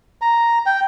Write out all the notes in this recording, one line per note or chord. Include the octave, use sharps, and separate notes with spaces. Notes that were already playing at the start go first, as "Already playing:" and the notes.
A#5
G5